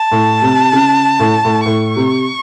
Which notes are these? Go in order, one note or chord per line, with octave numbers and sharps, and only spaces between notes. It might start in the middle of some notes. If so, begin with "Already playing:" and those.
Already playing: A5
A2
C3
C#3
A2
A2
A2 C#6
C3